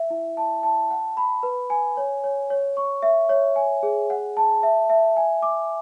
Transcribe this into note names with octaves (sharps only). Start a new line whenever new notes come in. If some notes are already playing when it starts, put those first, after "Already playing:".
Already playing: E5
E4
A5
A5
F#5
B5
B4
G#5
C#5
C#5
C#5
C#6
E5
C#5
G#5
G#4
F#5
A5
E5
E5
G#5
D6